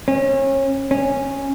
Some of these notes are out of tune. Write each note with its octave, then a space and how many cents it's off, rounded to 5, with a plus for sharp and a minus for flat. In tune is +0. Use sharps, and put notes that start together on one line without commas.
C#4 -30
C#4 -10